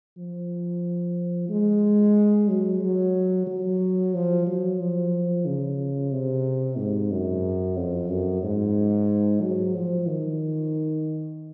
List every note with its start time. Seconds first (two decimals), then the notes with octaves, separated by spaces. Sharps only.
0.18 F3
1.49 G#3
2.49 F#3
2.82 F#3
3.47 F#3
4.14 F3
4.47 F#3
4.80 F3
5.46 C#3
6.12 C3
6.78 G#2
7.11 F#2
7.77 F2
8.10 F#2
8.43 G#2
9.42 F#3
9.76 F3
10.08 D#3